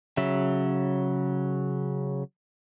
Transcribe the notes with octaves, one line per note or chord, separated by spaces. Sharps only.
C#3 F#3 E5